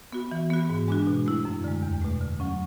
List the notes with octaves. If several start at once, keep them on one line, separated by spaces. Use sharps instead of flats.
B3 F#4
E3
B3 F#4
G#2
G#3 D4 F#4
B2
A3 E4
F#2
D3 G#3
E2
B2 A3
D3
F#3 C#4